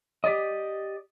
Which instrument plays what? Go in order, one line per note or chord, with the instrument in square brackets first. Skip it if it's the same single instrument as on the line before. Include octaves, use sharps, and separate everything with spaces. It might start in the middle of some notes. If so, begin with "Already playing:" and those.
[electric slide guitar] G4 D5 D#5